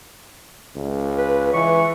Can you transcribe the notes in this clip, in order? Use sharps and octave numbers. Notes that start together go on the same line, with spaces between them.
C#2
B4
E3 C#6